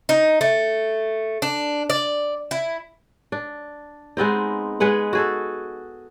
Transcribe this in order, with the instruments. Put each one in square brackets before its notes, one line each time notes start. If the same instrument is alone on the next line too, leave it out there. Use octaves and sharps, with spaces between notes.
[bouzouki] D#4
A3
D4
D5
E4
[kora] D4
G#3 B3 C4 D#4
G#3 G#4 B4 F#5
F#4 G#4 A4